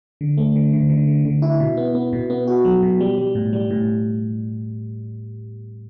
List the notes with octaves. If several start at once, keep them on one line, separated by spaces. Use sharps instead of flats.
D3
A3
D3
D3
D3
D3
D3
E4
B2
B3
B3
B2
B3
F#4
F#3
B2
G3
G3
A2
G3
A2